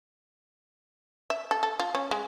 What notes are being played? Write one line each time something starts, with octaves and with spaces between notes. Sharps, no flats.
E5
A4
A4
F4
C#4
G#3